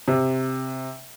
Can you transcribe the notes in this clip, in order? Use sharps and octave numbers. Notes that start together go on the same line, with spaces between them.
C3